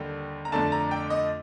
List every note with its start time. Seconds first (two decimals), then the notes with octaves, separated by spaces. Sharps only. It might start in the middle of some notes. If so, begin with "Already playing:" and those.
Already playing: D#2 D3 G3
0.45 A#5
0.52 F2 D3 A3 D4 A5
0.72 A#5
0.91 G5
1.10 D#5